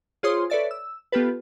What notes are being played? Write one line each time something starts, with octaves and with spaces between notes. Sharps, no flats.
F4 G#4 C5 C#5 C6 D#6
A4 B4 C#5 D5 E5 A6
E6
B3 F4 G4 A4 B4